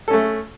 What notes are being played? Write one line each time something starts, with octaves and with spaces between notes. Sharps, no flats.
A3 C#4 A4